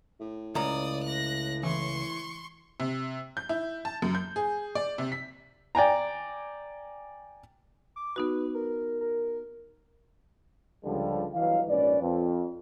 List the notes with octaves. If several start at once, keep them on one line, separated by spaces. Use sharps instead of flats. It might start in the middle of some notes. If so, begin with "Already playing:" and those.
A2
C#2 D5 A#5 D#6
F#6 A#6
E3 C6 C#6
C3
G6
E4
A5
F#2
G6
G#4
D5
C3
B6
D5 G5 G#5 A#5
D6
B3 D#4 F#4 B4
A#4
A#4
C#2 D3 F3 G3
G1 E3 F#3 B4 D#5 F5
A#1 G#2 C#4 B4 D5
F2